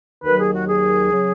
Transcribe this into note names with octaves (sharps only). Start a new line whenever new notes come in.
D#2 D#3 F#3 B4
G#4
F#4
G#4
C#3 F#3